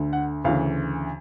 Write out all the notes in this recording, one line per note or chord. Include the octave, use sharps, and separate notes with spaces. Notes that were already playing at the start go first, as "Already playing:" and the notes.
Already playing: D2 D3
F#5
D2 C#3 E3 F5